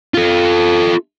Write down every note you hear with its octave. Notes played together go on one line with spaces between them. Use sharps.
F4 A4